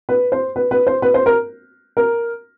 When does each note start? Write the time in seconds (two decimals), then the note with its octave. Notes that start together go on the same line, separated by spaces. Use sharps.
0.09 B4
0.32 C5
0.56 B4
0.71 B4
0.87 C5
1.02 B4
1.14 C5
1.26 A#4
1.97 A#4